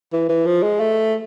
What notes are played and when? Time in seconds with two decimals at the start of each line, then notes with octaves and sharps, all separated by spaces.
0.13 E3
0.29 E3
0.46 F3
0.63 G#3
0.80 A3